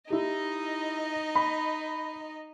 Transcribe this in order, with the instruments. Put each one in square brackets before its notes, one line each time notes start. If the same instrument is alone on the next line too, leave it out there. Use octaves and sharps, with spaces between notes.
[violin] D#4 D#5 [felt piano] E4 G4
[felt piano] B5